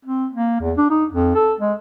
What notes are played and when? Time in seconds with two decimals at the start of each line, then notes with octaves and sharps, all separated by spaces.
0.05 C4
0.32 A#3
0.60 E2
0.77 D4
0.90 D#4
1.12 F2
1.35 A4
1.60 G#3